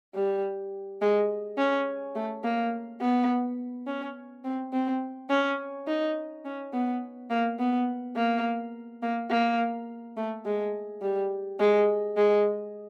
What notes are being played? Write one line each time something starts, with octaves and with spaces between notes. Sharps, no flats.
G3
G#3
C#4
A3
A#3
B3
C#4
C4
C4
C#4
D#4
C#4
B3
A#3
B3
A#3
A#3
A#3
A3
G#3
G3
G#3
G#3